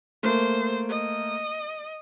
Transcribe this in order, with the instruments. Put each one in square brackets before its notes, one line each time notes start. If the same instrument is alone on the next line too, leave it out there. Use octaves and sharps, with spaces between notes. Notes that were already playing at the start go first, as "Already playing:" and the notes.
[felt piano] A3 A#3 [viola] C5
[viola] D#5